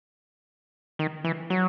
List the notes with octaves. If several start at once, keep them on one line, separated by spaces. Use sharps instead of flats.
D#3
E3
F#3